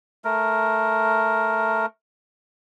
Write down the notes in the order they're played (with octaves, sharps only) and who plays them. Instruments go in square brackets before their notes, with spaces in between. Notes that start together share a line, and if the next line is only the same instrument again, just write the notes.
[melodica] A3 A#4